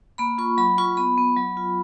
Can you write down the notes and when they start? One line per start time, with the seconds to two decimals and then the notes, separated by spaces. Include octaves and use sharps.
0.18 A#3 B5
0.38 F4 C#6
0.58 F#3 B5
0.78 F4 C#6
0.97 B3 B5
1.18 B3
1.37 F#3
1.57 F4